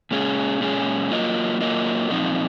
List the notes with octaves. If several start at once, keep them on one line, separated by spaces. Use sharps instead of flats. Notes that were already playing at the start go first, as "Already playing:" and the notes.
A#2 G#3 C#4 G#4
A#2 G#3 C#4 G#4
F#3 A#3 F4 A#4 D#5
F#3 A#3 F4 A#4 D#5
A#2 F3 C4 D#4